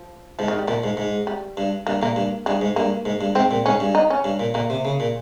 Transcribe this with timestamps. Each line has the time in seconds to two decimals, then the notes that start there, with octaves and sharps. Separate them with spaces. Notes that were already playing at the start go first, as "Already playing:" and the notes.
Already playing: F3
0.39 G#2 F3
0.48 D#3
0.58 G3
0.68 A#2 F3
0.84 G#2
0.97 G#2
1.27 G3
1.57 G2
1.87 G2 A#3
2.02 A#2 A#3
2.16 G2
2.46 G2 G#3
2.61 G#2
2.76 G2 A#3
3.05 G#2
3.21 G2
3.35 G#2 C4
3.51 A#2
3.66 G#2 C#4
3.80 G2
3.95 D#4
4.10 C#4
4.24 G2
4.40 A#2
4.54 A#2 A#3
4.70 C3
4.85 C#3
5.00 A#2